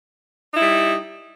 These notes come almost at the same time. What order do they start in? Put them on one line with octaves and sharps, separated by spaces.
D#4 E4 G3